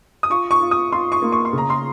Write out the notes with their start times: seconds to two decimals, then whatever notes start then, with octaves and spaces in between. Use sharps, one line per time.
0.23 D#6
0.30 F4 C#6
0.51 C#6
0.61 F4
0.71 D#6
0.92 F4 C6
1.12 C#6
1.22 A#3
1.32 C#6
1.45 C6
1.53 C#3 A#5
1.70 C6